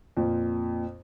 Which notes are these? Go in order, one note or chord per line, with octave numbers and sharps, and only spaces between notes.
F2 A#2